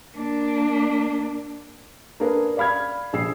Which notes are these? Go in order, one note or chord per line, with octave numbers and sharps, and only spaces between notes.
A#3 D4
A#3 D4 G#4 A#4 B4
D5 F5 B5 F6 G#6
A#1 G#4 E6 C7